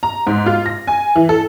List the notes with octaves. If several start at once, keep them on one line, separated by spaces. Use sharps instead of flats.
A#5
G#2
F4
A#6
G#5
E3
A4